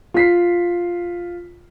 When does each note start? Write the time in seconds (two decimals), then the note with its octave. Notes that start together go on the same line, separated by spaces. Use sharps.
0.14 F4 B6 C7